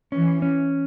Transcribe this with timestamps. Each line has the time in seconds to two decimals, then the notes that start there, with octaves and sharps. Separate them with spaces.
0.12 E3 C#4
0.42 C#4